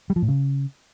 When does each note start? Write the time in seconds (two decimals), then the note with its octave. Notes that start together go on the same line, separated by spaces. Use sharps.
0.10 G3
0.16 F3
0.22 A2
0.28 C#3